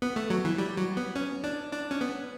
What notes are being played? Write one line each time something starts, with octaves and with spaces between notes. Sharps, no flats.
B3
A3
F#3
E3
G3
F#3
B3
C#4
D4
D4
C#4
B3